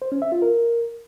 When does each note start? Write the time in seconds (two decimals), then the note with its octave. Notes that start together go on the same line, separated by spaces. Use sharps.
0.02 C5
0.12 C#4
0.22 E5
0.32 F4
0.42 A#4